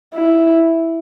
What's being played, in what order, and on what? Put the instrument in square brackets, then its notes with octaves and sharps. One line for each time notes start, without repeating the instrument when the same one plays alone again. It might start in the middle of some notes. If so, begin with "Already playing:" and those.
[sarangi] E4